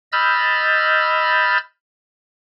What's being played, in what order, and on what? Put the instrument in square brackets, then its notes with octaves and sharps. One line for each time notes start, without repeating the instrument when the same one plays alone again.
[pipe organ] D#5 B5 E6 F6 G6 A6